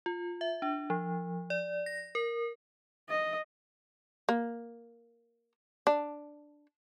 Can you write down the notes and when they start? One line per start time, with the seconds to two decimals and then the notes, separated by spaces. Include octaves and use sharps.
0.06 F4
0.41 E5
0.62 D4
0.90 F3
1.50 D5
1.86 A#6
2.15 A#4
3.09 D#5
4.29 A#3
5.87 D4